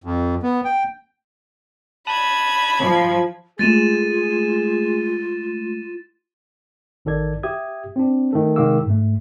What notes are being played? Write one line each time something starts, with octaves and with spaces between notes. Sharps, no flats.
F2
B3
G5
A5 B5 D#6 F#6 G#6
F3
G#3 A3 F4 G#4 A6 D#7 E7
A1 D#3 A4 D5 G#6
G4 E5 D#6 G#6
C4 D4
D#3 A3 A4
C3 D#3 G#3 F5 D6 E6
G#2 A3